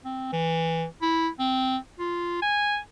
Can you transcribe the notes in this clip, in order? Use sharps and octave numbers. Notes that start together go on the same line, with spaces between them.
C4
E3
E4
C4
F4
G#5